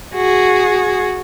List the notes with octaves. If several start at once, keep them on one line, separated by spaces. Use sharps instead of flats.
F#4 G#4